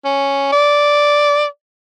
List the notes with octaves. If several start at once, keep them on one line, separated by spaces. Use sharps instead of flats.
C#4
D5